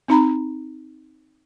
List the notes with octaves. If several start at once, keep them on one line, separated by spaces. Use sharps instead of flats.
C4 D#4 A#5 B5